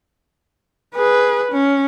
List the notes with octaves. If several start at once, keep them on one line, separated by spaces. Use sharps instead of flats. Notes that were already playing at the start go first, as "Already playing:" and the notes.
G#4 B4
C#4